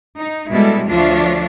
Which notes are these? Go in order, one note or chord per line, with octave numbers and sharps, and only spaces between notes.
D#4
B2 G3 G#3 E4 A4
D2 F3 D4 F4 C#5 E5